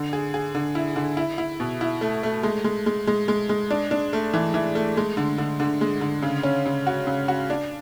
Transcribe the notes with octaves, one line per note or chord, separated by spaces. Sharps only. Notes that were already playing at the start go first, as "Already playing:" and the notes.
Already playing: D3
G#4
G#4
D3
E4
D3
E4
E4
B2
E4
A3
A3
G#3
G#3
G#3
G#3
G#3
G#3
D4
D4
A3
E3
E3
A3
G#3
D3
D3
D3
G#3
D3
C#3
C#4
C#3
F#4
C#3
F#4
D4